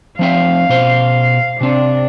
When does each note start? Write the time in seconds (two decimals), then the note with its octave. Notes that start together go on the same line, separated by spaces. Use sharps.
0.19 F3 C4 E5 F5
0.69 B2 C5
1.61 C3 C4 D4